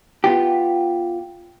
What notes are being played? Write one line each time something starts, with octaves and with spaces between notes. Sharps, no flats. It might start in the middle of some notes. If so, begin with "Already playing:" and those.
B3 F4 G4